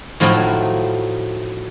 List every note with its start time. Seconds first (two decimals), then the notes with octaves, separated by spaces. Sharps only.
0.20 A2 F3 F#3 D#4 E4